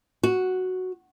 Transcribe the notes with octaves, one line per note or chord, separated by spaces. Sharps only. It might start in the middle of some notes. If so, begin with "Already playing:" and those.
F#4